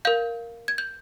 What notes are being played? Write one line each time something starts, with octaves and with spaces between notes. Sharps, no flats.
A#4 F5 G6
G#6
G6